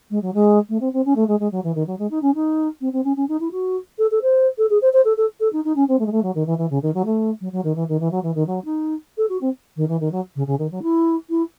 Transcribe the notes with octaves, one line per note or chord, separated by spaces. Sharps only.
G#3
F#3
G#3
A3
C4
C4
C#4
A3
G#3
G#3
F#3
E3
D#3
F#3
G#3
D#4
C#4
D#4
C4
C4
C#4
C#4
D#4
E4
F#4
A4
A4
C5
A4
G#4
C5
C5
A4
A4
A4
D#4
D#4
C#4
C4
A3
G#3
A3
F#3
D#3
E3
E3
C#3
D#3
F#3
A3
F#3
F#3
D#3
E3
D#3
E3
F#3
E3
D#3
F#3
D#4
A4
F#4
C4
D#3
E3
D#3
F#3
C#3
C#3
D#3
F#3
E4
E4